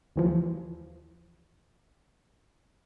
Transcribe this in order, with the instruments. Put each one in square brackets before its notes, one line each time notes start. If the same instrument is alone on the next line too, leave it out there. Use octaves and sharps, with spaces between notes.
[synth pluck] D#2 E3 F3